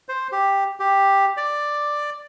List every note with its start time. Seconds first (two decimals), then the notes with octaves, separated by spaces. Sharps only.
0.09 C5
0.32 G4
0.80 G4
1.37 D5